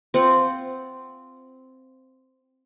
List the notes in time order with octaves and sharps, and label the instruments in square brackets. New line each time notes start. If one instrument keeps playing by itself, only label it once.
[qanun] C4 F4 F#5